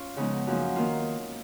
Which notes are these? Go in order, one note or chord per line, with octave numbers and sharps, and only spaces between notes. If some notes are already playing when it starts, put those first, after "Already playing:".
Already playing: C#4 F4
C#3 F3 G#3 B3 D#4
F#2 F3 A#3 D#4
D#3 A#3 F4